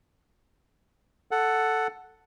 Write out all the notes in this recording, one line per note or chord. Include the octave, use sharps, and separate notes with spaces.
A4 F#5